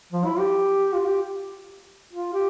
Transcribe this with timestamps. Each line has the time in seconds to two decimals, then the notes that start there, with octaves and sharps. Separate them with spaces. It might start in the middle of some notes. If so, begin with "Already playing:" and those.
0.12 F3
0.25 E4
0.39 G4
0.93 F4
1.06 G4
2.13 F4
2.33 G4